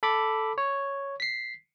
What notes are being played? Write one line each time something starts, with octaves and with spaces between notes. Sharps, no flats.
A4 B5 D6
C#5
B6 C7